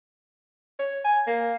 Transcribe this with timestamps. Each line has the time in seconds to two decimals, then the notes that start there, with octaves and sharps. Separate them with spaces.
0.79 C#5
1.05 G#5
1.27 A#3